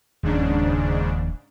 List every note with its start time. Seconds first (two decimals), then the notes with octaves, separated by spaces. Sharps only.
0.23 E1 D#2 G#2 C#3 F3 D4